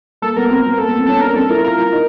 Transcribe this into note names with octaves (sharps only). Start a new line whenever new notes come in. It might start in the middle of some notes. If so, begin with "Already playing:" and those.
A#3 A4
B3 A#4
C4
B3
A#3 A4
B3
C4
C#4 A4
D4 A#4
C4 A4
E4 A#4
F4 A#4
E4
D#4